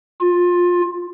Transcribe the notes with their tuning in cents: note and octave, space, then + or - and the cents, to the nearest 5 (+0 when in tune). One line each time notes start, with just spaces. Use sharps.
F4 +20